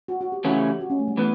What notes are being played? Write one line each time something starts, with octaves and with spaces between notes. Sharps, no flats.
F#4
F#4
G4
C#3 E3 A3 C#4 E4 F#4
G4
G4
F#4
C#4
A3
G3
E3 A3 B3